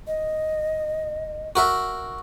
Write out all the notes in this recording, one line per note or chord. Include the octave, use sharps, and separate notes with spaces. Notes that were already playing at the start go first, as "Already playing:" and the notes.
D#5
F#4 A#4 E5